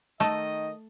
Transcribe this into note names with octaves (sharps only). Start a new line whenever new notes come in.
D#3 A3 D#5